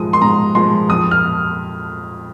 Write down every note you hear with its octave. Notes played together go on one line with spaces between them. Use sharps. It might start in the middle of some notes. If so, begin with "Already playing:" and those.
Already playing: G#2 F3 G#3 D#6
C6
G#2 A#5
F3 G#3 C6
F2 D#6
F6